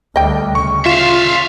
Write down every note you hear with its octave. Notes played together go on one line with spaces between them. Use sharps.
D2 G3 D#5 G5
C#3 C#6
F4 E5 F5 E7